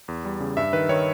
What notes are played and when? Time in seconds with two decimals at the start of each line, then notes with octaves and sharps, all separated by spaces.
0.08 E2
0.25 G3
0.40 C#3
0.57 G2 E5
0.73 D#3 B4
0.89 D#3 C#5